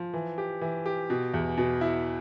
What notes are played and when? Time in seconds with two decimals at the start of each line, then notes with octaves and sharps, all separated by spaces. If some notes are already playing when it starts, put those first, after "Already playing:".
Already playing: F3
0.14 E3
0.38 G4
0.61 E3
0.86 G4
1.10 B2
1.34 E2
1.57 B2
1.81 E4